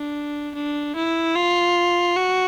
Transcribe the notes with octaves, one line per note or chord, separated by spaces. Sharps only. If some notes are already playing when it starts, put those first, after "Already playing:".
Already playing: D4
D4
E4
F4
F#4